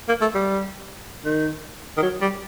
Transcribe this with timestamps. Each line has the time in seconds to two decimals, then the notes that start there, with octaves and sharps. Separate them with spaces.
0.08 A#3
0.21 A3
0.34 G3
1.25 D#3
1.97 D#3
2.03 F#3
2.22 G3